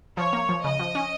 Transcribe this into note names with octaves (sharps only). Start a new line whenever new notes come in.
F3 C#5
A#3
F3
C#3 D#5
F3
C#4